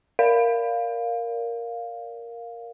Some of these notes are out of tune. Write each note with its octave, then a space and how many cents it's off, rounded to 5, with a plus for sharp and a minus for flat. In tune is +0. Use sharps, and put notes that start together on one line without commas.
A#4 +0 D5 -25 F5 +5